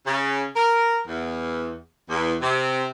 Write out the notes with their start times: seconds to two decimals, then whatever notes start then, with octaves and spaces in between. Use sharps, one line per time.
0.07 C#3
0.56 A#4
1.07 E2
2.10 E2
2.42 C3